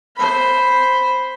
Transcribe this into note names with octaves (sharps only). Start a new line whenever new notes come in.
C5 B5